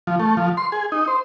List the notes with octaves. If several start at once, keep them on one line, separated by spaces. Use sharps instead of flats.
F3
A3
F3
C6
G#4
D#4
C5